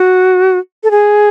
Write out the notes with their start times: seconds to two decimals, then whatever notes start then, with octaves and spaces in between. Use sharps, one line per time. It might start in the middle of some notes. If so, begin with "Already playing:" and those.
Already playing: F#4
0.84 A4
0.91 G#4